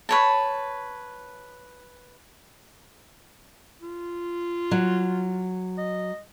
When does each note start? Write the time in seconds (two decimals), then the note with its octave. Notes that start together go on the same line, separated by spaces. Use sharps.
0.09 B4 C#5 A5
3.82 F4
4.71 F#3
5.78 D#5